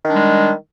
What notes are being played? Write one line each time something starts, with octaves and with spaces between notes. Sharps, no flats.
D#3 G3 G#3 D4